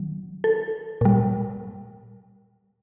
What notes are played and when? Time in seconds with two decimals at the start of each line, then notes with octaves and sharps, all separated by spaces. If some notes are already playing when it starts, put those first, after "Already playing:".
Already playing: D#3 F#3
0.44 A4
1.01 A#2 G3